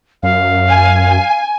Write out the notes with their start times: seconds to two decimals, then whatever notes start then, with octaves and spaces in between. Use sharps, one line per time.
0.23 F#2 F5
0.68 G#5